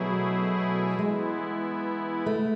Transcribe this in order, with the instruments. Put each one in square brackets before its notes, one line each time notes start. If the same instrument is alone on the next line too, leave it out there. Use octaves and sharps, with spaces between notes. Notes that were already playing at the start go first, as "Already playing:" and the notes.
Already playing: [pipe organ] B2 A3 E4 G#4 [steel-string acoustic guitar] F#3
[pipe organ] E3 B3 E4 [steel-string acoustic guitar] G#3
[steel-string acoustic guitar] A3